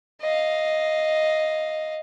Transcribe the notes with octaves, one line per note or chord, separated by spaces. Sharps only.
D#5 F5